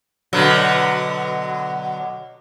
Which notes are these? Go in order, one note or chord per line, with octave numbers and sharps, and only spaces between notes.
B2 D3 F#3